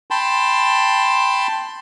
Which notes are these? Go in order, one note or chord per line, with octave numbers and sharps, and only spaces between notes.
G5 A5 B5 C6